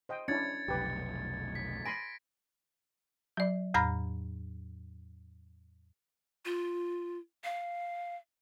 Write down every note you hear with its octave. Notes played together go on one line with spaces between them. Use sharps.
C5 D#5 G5
C#4 D4 E4 G#6 A6 C#7
F1 B1 G4 B4
B6
G#5 B5 C6 A#6 D7
F#3 D5
E2 A2 A#5 B5 F6 A#6
F4
F5